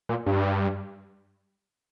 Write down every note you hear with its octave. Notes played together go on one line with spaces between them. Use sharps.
A#2
G2